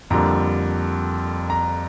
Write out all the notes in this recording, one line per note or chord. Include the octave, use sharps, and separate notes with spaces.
F2 D3 G3 A#3 A#5
A#5